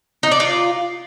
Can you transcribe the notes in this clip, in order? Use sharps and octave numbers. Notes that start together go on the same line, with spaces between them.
D#4
D5
F4